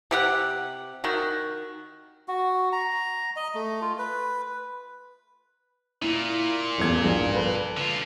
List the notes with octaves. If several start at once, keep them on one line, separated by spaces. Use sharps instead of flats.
C3 G4 F#5
D#3 F#4
F#4
A#5
D#5
A3
F4
B4
A#2 E4
D#1 E2 G#6
A#1 G2
A4 B4
D3 F4